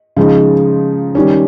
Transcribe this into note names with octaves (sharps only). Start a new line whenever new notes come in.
C#3 F3 G#3 D#4
D#3 G3 C#4